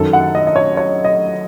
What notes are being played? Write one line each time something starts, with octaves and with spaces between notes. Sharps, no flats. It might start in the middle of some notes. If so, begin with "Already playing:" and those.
Already playing: F#2 D#3 F#3 A4
F#5
D#5
D#5
C#5
C#5
D#5